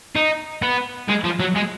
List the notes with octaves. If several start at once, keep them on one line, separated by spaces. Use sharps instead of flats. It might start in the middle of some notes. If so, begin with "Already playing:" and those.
D#4
B3
G#3
F3
F#3
G#3